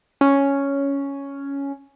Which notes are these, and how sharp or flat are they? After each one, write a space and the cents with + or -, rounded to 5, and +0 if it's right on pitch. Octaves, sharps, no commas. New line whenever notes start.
C#4 +5